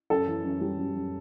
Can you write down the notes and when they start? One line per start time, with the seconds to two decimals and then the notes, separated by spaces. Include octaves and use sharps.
0.10 F#2 A4
0.27 E3
0.44 F#2
0.61 G3
0.78 F#2
0.95 F#2